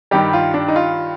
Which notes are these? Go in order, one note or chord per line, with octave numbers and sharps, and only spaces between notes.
G2 D#3 G3 G4
F4
D4
D#4
F4